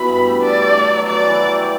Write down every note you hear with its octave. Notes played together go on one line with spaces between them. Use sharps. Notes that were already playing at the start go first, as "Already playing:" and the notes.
Already playing: B2 E3 B3 B5
G2
A3
D4 D5
A3
A3
F#3
A3 D5
E3
F#3
G4